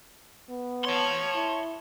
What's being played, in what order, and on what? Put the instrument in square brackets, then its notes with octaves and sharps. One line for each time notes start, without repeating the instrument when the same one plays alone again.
[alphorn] B3
[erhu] C#5 [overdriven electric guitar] A5 C6
[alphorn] E4